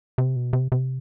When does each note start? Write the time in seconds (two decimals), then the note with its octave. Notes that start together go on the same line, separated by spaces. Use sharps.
0.18 C3
0.36 B2
0.53 C3
0.72 C3